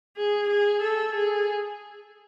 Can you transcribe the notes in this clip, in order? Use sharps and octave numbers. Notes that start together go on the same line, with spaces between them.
G#4
G#4
A4
G#4